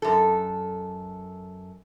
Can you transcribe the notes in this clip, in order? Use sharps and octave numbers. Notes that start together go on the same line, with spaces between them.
F#2 A4